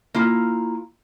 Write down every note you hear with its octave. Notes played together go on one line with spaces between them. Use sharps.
A#3 E4 F4